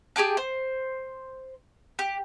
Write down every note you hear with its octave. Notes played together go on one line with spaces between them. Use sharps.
G4 G#4 G5 A5
C5
G4